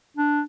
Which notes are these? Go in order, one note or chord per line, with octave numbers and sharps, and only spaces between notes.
D4